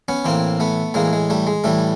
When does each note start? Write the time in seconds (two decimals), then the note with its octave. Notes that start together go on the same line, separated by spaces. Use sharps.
0.08 B3 C#4
0.25 A2 E3 A#3 C4
0.60 A3 B3
0.94 A2 E3 G#3 A#3
1.13 G#3
1.30 G3 A3
1.47 G#3
1.64 A2 E3 G3 A3